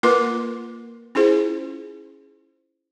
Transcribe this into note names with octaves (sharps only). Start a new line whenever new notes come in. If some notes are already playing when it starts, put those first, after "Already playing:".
A#3 F4 A#4 B4 C6 D6
C#4 E4 F4 G#4 C5